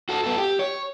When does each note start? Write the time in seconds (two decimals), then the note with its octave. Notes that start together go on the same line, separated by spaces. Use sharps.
0.09 F#4 A4
0.23 B3 A4
0.38 G4
0.59 C#5